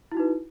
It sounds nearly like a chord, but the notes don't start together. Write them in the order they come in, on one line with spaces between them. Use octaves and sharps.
E4 F#4 D#4 B4